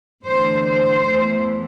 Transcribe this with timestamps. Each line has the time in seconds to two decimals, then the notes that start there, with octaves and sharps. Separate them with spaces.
0.24 E2 D3 A3 C5
0.64 C5
1.03 E2 E3 A3